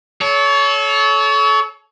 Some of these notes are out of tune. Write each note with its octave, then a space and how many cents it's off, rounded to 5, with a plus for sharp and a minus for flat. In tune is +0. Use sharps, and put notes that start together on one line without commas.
A4 -30 C#5 +25